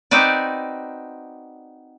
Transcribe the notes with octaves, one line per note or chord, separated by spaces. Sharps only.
C4 D#4 F#4 B4 D5